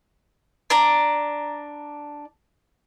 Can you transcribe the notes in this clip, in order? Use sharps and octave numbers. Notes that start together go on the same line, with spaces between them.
D4 D5 A#5